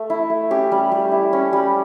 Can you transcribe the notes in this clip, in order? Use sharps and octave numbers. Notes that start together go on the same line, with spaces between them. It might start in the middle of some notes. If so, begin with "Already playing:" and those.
Already playing: A3
E4
A3
C#4 G4
G3
G3
E4
C#4
G3